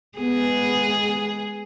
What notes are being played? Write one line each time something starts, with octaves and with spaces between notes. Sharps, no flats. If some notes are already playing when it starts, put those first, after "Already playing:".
G#3 B3 G#4